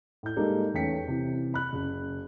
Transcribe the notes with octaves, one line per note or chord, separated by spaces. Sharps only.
A2 G6
G3 G#3 A#3 D#4 G4 A4
E2 A3 C#4 G5 B6 C#7
C3 E3
B5 F#6
F#1